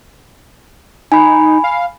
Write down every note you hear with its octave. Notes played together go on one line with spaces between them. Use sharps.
D#4 G#5 B5
F5